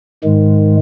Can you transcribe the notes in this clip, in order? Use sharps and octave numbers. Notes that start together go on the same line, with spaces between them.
G#2 D#3 G#3